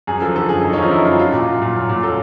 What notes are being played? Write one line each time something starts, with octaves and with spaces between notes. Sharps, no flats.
F#2 G#4
F3 A4
D3 A4
F#2 G#4
F#2 D#4
C#4
F3 D#4
D3 E4
F#2 F4
F#3 F4
A#2
F#3
A#2
F#3
A#2
F#3 A4